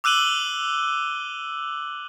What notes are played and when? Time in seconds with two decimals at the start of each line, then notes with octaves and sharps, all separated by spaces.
0.04 D6 E6 F#6 D#7 F#7 G7